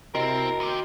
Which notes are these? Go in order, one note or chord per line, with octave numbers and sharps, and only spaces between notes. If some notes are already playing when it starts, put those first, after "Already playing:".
C3 C4 E4 F#4 A#4 D#5
D#4 G4 G5 C6